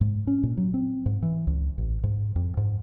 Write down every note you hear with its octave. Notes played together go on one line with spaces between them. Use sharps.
G#2
C#4
A#2
F#3
C4
G#2
E3
C#2
A1
G#2
F2
G#2